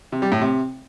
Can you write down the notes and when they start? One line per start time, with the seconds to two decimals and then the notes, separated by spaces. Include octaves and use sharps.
0.12 C3
0.22 G3
0.32 A2
0.41 C3